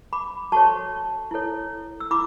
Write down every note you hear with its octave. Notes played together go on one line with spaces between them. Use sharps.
B5 D6
F#4 A4 C#5 A5 C#6
E4 A4 C#5
E6
E4 B5 D6